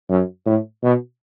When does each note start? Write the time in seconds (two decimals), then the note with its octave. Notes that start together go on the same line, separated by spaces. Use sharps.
0.10 F#2
0.46 A2
0.83 B2